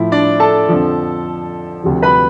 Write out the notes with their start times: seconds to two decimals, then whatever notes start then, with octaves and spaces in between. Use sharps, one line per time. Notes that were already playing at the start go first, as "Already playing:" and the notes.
Already playing: A2 F3 E4
0.12 D4 D5
0.40 A4 A5
0.69 F2 D3 F3
1.83 D2 C3 F3
2.02 B4 B5